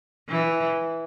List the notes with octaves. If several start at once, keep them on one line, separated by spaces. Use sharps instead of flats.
E3